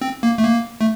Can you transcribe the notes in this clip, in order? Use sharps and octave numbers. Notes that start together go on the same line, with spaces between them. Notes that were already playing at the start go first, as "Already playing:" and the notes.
C4
A#3
A3
A#3
A3